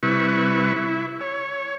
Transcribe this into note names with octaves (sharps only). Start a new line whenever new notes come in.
C3 G3 E4 B4 C#6
E4
C#5